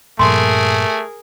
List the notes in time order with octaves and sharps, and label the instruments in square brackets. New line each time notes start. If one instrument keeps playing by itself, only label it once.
[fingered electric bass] G2 A#2 F3 [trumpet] A3 [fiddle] G#4 A#4 [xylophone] C6